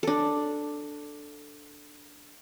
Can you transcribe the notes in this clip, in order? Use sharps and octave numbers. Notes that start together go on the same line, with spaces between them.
D4 A4